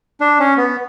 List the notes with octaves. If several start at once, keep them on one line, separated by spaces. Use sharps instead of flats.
D4
C#4
B3